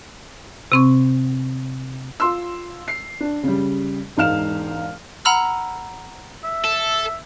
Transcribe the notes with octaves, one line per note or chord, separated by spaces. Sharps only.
C3 C4 C#6
F4 C6 E6
C7
D4
C#3 G3
E1 G#2 D#4 F5 F6 E7
F#5 A#5 B5 E6 F6
E5
A4